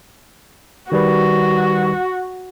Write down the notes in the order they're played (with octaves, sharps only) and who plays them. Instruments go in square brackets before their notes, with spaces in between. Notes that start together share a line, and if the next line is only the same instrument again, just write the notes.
[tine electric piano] D#3 G3 B4 [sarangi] F#4